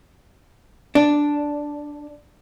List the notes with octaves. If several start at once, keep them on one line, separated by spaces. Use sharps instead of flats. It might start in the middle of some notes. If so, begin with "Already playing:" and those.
D4